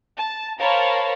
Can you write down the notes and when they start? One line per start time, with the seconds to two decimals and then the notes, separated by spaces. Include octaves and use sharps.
0.18 A5
0.59 A#4 C5 C#5 F5 A5 B5